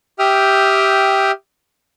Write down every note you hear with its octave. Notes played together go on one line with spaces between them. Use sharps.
G4 E5 G5 D#6 F6